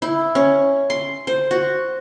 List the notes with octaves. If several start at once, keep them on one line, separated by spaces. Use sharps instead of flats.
E4
C#4
C6
C5
F#4